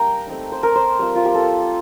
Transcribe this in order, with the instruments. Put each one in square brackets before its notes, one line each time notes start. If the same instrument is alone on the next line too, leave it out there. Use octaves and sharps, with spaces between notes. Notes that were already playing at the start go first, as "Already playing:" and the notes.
Already playing: [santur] G3 A#3 D4 G5 A#5
A3 C4 D#4
C5
A#4
C5
G3 C4 F4
F4
G4
A4